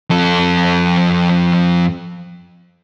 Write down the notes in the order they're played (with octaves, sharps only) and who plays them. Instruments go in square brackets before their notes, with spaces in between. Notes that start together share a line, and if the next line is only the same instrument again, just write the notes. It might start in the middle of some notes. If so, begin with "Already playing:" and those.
[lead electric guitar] F2 A4